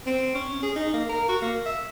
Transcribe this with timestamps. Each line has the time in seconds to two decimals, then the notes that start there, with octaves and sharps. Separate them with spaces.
0.06 C4
0.35 C#4
0.62 G#4
0.76 D#4
0.93 A#3
1.09 A#4
1.29 F#4
1.42 A#3
1.66 E5